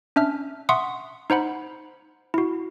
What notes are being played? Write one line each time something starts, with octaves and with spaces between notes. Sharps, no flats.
C#4 D4 E5 F6
E5 F#5 C6 C#6 D#6
D#4 C5 F#5 B5
E4 F#4